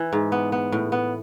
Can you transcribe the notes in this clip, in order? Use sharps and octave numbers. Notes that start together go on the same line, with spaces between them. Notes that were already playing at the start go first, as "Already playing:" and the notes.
Already playing: E3
G#2
B3
B3
A2
B3